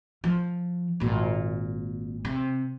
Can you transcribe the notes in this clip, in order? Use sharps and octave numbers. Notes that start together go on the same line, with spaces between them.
F3
G#1 A#2
C3